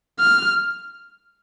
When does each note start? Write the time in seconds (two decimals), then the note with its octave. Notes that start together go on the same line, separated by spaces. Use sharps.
0.19 F6